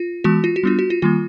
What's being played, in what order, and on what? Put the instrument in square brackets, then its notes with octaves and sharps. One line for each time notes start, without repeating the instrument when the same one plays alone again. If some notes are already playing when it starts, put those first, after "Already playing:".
Already playing: [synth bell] F4
E3 G#3 B3 F#4
F4
F#4
G3 B3 D4 F4
F#4
F4
D#3 G3 A#3 F4